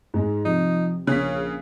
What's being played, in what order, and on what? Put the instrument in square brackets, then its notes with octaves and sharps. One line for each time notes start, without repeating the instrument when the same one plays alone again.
[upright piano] G#2 G#3
[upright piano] C3 [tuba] F3 [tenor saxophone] D#4
[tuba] A#1 [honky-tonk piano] C#3 [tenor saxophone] C#4 [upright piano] F#6 B6